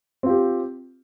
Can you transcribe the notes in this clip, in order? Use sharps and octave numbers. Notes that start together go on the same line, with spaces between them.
C4 F4 G4